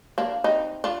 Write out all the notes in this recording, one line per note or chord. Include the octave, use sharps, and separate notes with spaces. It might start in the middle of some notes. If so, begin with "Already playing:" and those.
A#3 D4
C4 D#4
D4 F4